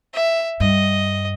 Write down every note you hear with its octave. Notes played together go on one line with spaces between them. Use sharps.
E5
G2 D#5